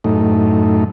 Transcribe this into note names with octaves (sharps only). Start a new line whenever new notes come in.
F#2 A2 A3 D#4